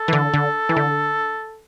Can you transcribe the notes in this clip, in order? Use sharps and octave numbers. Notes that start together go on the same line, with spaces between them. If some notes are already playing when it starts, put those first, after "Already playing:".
Already playing: A4
E3
D3
D3
E3
D3